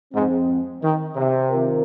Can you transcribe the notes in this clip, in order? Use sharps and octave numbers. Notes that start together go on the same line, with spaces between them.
F2 G#2 F3 C4
D#3
C3
D#3 C4 F4 A#4